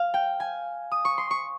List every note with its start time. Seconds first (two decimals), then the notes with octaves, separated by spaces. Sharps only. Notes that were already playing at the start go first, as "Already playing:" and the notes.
Already playing: F5
0.14 G5
0.40 G#5
0.91 D#6
1.05 C#6
1.18 C6
1.31 C#6